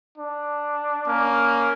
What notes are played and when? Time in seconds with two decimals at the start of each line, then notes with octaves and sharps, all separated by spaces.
0.18 D4
1.07 A#3 C#4